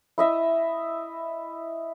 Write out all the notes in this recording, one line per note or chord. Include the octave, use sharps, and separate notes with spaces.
E4 D#5 E5